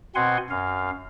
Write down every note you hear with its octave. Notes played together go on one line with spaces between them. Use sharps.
B2 C4 F#5 G#5 C6
F#2 F5